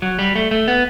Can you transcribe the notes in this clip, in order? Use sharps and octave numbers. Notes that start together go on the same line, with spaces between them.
F#3
G3
A3
A3
B3